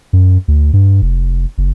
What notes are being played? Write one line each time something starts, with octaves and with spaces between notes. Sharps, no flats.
F#2
D2
G2
F1
F#1